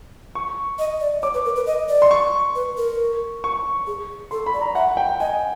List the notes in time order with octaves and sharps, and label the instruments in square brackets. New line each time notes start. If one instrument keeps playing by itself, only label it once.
[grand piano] C#6
[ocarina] D#5
D5
[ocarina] C#5 [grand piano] D6
[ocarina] B4
A#4
B4
D#5
D5
[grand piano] C6
C#6
[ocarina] B4
A#4
[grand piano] C#6
[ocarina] G#4
[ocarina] A4 [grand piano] C6
[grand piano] B5
[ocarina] D5
[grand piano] A#5
[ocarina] E5 [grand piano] F#5
[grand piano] G5
[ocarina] D#5 [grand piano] G#5